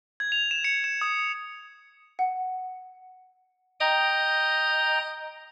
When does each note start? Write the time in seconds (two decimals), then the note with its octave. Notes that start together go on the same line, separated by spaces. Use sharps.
0.20 G#6
0.32 F7
0.51 E7
0.64 C#7
0.84 E7
1.01 D#6
2.19 F#5
3.80 D#5 G5 A#5